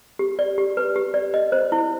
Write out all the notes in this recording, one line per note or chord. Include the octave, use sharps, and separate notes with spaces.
G4
D5
G4
B4
G4
D5
D#5
C5
E4